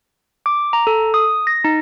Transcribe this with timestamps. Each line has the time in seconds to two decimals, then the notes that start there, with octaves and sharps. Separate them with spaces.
0.46 D6
0.73 A#5
0.87 A4
1.14 D#6
1.47 A#6
1.64 D#4